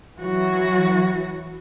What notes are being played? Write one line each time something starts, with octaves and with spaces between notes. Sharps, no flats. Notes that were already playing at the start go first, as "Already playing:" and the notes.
E3 F#3 F#4